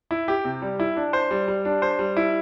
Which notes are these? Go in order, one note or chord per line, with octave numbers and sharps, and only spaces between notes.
E4
G4
C3
G3
E4
D4
C5
G3
G3
D4
C5
G3
E4